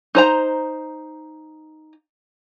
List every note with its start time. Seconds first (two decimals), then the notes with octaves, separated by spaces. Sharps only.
0.15 D#4 C5 A#5